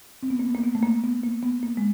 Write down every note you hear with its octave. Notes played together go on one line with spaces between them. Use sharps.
C4
B3
A#3
B3
A#3
B3
A3
A#3
B3
A#3
B3
A#3
G#3